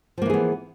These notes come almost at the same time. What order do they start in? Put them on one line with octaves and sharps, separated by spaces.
F3 A#3 E3 G#4 B3